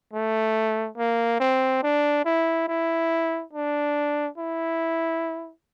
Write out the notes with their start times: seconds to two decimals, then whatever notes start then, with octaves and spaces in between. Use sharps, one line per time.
0.13 A3
0.97 A#3
1.40 C4
1.83 D4
2.25 E4
2.68 E4
3.53 D4
4.38 E4